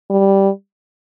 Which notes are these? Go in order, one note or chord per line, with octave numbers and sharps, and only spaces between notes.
G3